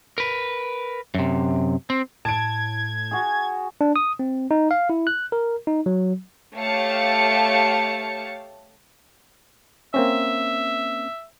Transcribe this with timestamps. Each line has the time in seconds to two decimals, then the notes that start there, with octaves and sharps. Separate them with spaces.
0.18 A#4 B4
1.15 F#2 C3
1.90 C4
2.25 A2 A5 G#6 D7
3.11 F#4 G#4
3.81 D4
3.96 D#6
4.19 C4
4.51 D#4
4.71 F5
4.90 E4
5.07 F#6
5.32 A#4
5.67 D#4
5.86 F#3
6.57 A3 G4 C#5 F5 A5 C#7
9.94 A#3 C4 C#4 E5